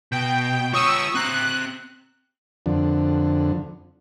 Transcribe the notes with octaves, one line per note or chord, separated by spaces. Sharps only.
B2 G5
F4 C#5 C#6 D#6 E6
C4 A#5 F#6
F2 D3